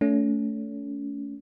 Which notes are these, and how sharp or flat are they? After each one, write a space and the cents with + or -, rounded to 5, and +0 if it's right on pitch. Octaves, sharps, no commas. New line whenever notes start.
A3 +0 C#4 +35